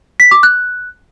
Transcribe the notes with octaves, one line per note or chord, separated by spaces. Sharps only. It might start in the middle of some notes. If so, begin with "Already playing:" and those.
B6
D6
F#6